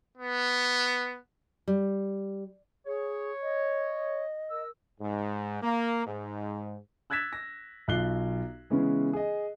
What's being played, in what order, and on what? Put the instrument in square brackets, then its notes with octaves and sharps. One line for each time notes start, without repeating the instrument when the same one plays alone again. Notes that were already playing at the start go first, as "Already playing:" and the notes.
[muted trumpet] B3
[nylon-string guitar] G3
[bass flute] G#4 [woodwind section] C#5
[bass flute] D#5
[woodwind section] A#4 E6
[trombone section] G#2
A#3
G#2
[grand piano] E6 F#6 G#6 A6 B6 E7
A#6
B1 F4 F#6 C7 G7
C#3 E3 G#3 B3 C#4
G#4 D#5